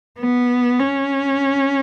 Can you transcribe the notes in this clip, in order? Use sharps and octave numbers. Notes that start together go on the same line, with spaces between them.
B3
C#4